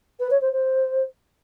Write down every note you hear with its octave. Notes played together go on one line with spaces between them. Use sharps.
B4
C#5
C5
C5